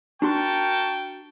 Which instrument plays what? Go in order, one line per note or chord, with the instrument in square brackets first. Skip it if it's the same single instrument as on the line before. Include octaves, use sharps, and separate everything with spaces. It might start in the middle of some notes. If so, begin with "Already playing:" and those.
[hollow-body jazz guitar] D4 F#4 C6 [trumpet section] A#4 A5 C#6 [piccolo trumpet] G5